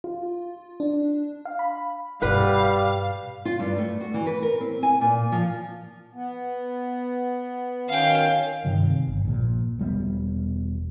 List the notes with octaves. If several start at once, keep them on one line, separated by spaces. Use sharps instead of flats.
F4
D4
F5
B5
G2 B2 G3 B4 F5 F#5
F4
G2
A3
F#4
E3
B4
A#4
C4
G#5
A#2
F3
B3
D#3 F#3 C#4 F5 G5
G2 C3 D#3
G1
A#1 A#2
E1 G3 B3